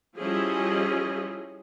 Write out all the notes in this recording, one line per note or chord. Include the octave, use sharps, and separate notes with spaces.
F3 G3 C#4 E4 G#4 D#5